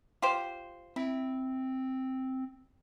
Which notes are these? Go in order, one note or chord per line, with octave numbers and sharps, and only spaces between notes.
F4 G4 C5
C4 E4